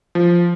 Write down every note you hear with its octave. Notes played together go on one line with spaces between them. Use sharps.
F3